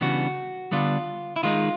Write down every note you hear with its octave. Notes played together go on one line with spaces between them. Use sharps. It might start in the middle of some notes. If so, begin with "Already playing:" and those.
C#3 E3 G3 B3 D4 F#4
D3 G3 B3 D4 F4
E4
D#3 G#3 C4 D#4 F4